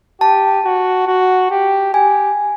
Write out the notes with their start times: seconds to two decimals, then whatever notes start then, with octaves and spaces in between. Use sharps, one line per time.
0.21 G4 A5
0.65 F#4
1.07 F#4
1.51 G4
1.93 G4 G#5